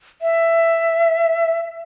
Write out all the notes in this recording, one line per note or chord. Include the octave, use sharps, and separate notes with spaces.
E5